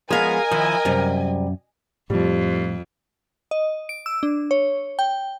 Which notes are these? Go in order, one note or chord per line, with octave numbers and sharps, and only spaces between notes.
F3 G#3 B3 G#4 A#4 D#5 F5 G#5
D#3 F3 E4
F#2 C3 G3
F2 A2 F3 G3
D#5
D7
E6
D4
C#5
G5